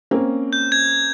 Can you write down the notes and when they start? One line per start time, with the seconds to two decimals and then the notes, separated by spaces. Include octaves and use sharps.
0.11 A#3 C4 C#4
0.53 G6
0.72 G#6